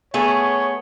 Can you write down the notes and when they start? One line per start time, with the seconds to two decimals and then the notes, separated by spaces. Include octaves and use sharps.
0.14 A3 B3 G#4 C#5